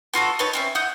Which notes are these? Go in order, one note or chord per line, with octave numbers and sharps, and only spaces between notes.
B3 F4 F#4 A4
D#4 B4 C#5 A5
C4 C#4 E4
E4 F#5 D#6 G6